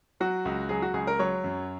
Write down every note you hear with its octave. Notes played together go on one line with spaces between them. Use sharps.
F#3 F#4
C#2
F#3 G#4
F#4
C#2 G#4
A#4
F#3 C#5
F#2